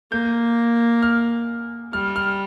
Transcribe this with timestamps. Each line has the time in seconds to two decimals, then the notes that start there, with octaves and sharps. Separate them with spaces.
0.11 A#3 G6
1.02 F6
1.93 G3 F6
2.16 F6